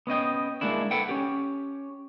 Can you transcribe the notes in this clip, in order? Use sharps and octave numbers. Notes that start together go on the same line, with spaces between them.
B3 C#4 D#5 G5
G#3 A#3 D4 E4
A4 B4 F#5 G5
C#4 G4